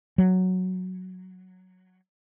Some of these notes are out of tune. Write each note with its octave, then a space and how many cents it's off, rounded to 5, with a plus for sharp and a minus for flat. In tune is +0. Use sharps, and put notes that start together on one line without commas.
F#3 +0